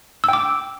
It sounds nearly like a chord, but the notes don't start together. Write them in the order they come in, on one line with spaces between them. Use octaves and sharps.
E6 G5 D6